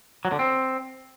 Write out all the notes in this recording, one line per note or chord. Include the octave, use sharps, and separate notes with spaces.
F#3
D3
C4